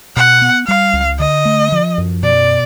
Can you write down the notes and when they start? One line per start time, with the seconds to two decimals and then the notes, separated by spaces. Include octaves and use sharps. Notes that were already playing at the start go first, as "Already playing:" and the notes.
0.16 B2 F#5
0.42 B3
0.67 G3 F5
0.93 C#2
1.19 D3 D#5
1.45 A3
1.72 F3
1.98 F#2
2.23 B2 D5